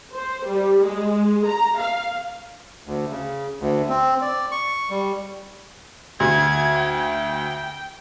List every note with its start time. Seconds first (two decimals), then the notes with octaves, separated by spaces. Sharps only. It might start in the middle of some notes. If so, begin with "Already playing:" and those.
0.13 C5
0.46 G3
0.81 G#3
1.46 A#5
1.81 F5
2.86 D2
3.10 C#3
3.60 D2
3.89 C4
4.22 D5
4.51 C#6
4.90 G3
6.20 D2 G#6
6.78 G5